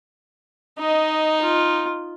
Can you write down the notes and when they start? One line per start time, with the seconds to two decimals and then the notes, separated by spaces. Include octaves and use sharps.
0.79 D#4 D#5
1.42 F4